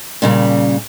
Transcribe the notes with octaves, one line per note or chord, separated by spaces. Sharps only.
A#2 C#3 G3